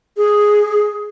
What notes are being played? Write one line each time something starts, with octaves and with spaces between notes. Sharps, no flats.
G#4